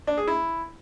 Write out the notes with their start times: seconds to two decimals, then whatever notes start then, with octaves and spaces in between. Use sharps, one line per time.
0.07 D4
0.17 G#4
0.27 E4